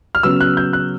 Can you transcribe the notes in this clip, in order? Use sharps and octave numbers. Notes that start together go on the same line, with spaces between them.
F6
C#3 F#3 B3 E6
F#6
G6
F#6